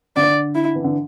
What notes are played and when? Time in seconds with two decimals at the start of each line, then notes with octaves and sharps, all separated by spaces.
0.16 D3 D5
0.55 E4
0.75 E3
0.84 D3